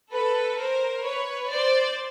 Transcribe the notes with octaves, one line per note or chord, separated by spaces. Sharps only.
A4 B4
A#4 C5
B4 C#5
C5 D5